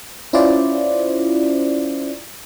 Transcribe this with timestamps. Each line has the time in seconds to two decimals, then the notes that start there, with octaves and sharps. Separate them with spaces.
0.33 C#4 E4 F4 C5 D5